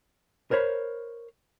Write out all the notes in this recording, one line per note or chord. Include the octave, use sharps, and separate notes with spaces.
A#4 C5 C#5 B5